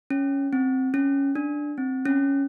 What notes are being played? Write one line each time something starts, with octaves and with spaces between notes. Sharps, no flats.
C#4
C4
C#4
D4
C4
C#4